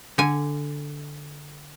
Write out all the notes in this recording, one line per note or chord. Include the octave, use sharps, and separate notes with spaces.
D3 G#5